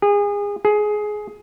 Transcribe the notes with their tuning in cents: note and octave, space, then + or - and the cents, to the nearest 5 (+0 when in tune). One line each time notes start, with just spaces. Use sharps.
G#4 -30
G#4 +15